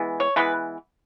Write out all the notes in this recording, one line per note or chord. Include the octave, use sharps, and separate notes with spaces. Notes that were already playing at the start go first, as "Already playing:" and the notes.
Already playing: E3 G#3 B3
C#5
E3 G#3 B3 B4